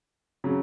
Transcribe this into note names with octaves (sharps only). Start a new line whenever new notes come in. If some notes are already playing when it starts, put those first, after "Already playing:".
C#3 F#3